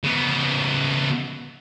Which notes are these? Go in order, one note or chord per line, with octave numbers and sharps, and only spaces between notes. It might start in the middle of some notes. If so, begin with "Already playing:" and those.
C#3 B3